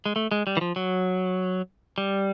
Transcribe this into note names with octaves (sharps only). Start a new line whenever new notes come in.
G#3
A3
G#3
G3
E3
F3
F#3
G3